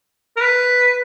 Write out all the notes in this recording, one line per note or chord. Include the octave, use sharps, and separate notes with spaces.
A#4
B4